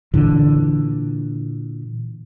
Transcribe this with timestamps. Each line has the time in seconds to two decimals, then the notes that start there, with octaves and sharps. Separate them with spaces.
0.14 A#2 D3 E3